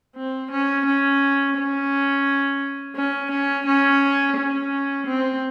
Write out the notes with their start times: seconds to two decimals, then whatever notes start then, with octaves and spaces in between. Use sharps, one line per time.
0.16 C4
0.51 C#4
0.86 C#4
1.57 C#4
2.96 C#4
3.31 C#4
3.66 C#4
4.37 C#4
5.07 C4